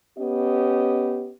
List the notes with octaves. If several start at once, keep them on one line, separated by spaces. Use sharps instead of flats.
B3 C#4 G4 D#5